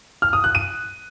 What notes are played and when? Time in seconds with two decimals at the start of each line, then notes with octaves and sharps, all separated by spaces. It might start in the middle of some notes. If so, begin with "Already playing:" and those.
0.22 F6
0.33 D#6
0.44 F#6
0.55 D#7